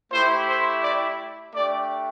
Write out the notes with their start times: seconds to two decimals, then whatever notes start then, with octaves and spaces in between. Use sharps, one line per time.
0.11 A3 E4 G4 C5
0.48 C5
0.82 D5
1.54 A3 D4 G4 D5